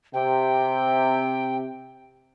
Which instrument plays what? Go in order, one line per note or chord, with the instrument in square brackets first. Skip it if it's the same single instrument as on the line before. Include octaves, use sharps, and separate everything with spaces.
[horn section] C3 [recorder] G5